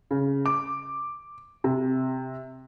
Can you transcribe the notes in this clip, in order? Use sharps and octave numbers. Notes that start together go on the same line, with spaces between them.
C#3
D6
C3